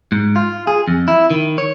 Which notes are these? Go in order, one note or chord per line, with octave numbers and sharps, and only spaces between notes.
G#2
F4
G#4
F2
E4
D#3
C#5